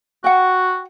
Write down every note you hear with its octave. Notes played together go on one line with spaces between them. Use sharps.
F#4 F#5 G5